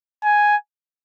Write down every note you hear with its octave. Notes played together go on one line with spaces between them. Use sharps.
G#5